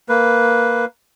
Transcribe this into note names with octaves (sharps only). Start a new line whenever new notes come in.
A#3 B4